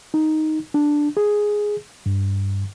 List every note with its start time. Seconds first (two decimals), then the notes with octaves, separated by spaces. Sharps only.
0.14 D#4
0.74 D4
1.17 G#4
2.06 G2